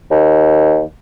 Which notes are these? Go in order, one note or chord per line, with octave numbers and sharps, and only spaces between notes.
D#2